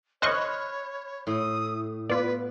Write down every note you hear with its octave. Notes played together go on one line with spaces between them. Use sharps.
C5 C#5 D#5 B5 C#6 F6 F#6
A2 D#6
B3 F4 B4 D5